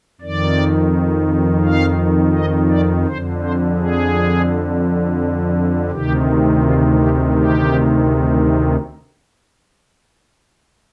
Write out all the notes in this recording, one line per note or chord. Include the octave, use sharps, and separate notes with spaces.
F2 D#3 D5
F5
D#5
D5
F2 D3 C5
C5
G#4
D2 C3 D#3 G4
F4
G4
G4